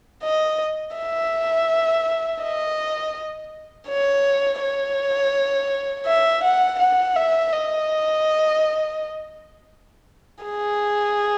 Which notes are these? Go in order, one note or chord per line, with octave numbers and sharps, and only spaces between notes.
D#5
E5
D#5
C#5
C#5
E5
F#5
F#5
E5
D#5
G#4